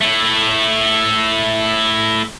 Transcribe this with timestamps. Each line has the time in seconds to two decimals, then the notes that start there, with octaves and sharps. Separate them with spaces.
0.01 A3 E4